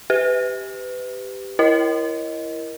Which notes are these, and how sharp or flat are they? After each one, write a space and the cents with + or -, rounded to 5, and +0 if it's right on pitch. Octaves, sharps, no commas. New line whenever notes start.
G4 +0 B4 +25
E4 +15 A#4 +20 D#5 +0